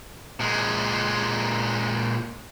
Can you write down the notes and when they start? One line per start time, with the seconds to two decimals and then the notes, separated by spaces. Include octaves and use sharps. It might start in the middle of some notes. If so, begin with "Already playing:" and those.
0.40 A#2 G#3